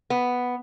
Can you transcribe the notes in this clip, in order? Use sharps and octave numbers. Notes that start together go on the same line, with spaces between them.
B3